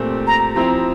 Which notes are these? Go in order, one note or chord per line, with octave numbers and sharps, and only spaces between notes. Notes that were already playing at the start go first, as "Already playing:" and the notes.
Already playing: A#2 A3 C4 G4
A#5
F3 C4 E4 A#5